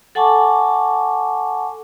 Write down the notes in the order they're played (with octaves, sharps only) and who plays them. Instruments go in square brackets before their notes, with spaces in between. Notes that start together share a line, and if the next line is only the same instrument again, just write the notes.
[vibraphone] A4 F#5 G#5 A5 C#6 D6